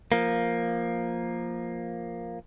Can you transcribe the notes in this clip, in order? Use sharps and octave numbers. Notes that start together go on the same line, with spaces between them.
F3 A#3